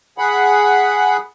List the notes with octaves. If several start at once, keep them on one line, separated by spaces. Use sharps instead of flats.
G#4 F#5 B5